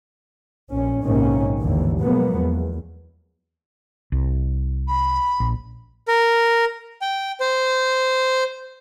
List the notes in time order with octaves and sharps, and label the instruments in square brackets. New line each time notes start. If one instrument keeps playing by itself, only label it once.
[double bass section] A#1 C#4
A#1 G#2 C3 D#3 A#3 C#4
G#1 D#2 A2 D3 E3
B2 F3 F#3 G#3 A#3 B3
E2
[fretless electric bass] C2
[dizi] B5
[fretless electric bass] A#1
[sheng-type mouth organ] A#4
G5
C5